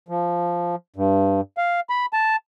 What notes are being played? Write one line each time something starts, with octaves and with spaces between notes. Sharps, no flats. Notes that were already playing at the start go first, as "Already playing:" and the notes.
F3
G2
F5
B5
A5